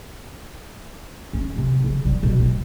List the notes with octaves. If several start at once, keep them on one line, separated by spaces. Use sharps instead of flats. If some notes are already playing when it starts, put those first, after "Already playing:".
C#4
C3
C#3
G3
B2
C4